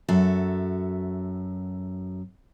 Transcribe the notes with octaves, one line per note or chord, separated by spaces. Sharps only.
F#2 F#4 A4 E5